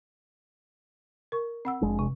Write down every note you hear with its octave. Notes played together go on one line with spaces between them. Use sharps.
A#4 C#6
C4 F#5 E6
F1 G#3 D4
C3